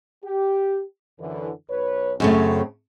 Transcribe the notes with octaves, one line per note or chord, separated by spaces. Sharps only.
G4
F#2 D3 E3
B1 B4 C#5
F#2 C#3 A3 C4 C#4